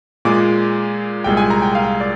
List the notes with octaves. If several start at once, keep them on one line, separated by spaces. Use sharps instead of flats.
A#2 G#3 D6
C2 A#2 G#3 G5
G#5
A#5
G5
F5
D5